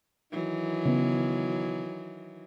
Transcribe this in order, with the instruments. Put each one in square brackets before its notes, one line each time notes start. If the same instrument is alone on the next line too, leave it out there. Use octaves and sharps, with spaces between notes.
[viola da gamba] D#3 E3 F#3
[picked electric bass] C#3 B3